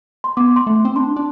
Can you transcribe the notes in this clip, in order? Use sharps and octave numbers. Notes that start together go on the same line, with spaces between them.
C6
B3 D6
C6
A3
C4
D4 C6
D4